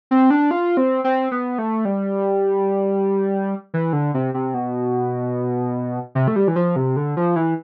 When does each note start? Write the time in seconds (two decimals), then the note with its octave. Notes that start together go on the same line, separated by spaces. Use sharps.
0.11 C4
0.30 D4
0.51 F4
0.77 C4
1.04 C4
1.31 B3
1.58 A3
1.85 G3
3.74 E3
3.93 D3
4.14 C3
4.34 C3
4.54 B2
6.15 C3
6.28 A3
6.36 G3
6.48 E3
6.56 F3
6.76 C3
6.96 D3
7.17 F3
7.36 E3